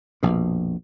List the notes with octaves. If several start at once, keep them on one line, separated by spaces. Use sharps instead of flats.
A#1 F2 B2